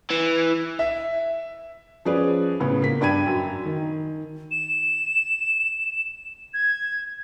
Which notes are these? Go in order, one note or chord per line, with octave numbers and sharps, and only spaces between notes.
E3
E5
F3 C#4 G#4 B4 D5
A2 C#3 B3
A#3 B6
G2 D4 G5 B5 G#6 D#7
F#2
D#3
E7
G#6